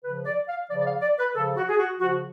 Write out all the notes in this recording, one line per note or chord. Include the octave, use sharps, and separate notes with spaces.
C#3 F3 B4
D5
F5
C#3 F3 D5
D5
F5
D5
B4
C#3 F3 A4
F#4
G#4
F#4
C#3 F3 F#4